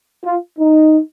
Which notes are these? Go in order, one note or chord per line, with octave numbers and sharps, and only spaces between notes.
F4
D#4